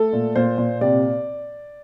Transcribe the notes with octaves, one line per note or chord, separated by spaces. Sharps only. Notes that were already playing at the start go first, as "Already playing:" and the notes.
Already playing: A3 A4
A#2
A#2 C5
A#2
C3 D5